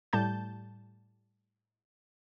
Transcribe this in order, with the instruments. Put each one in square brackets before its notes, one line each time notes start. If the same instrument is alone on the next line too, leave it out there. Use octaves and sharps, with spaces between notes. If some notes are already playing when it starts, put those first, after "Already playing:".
[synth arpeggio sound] A2 G3 A5 G6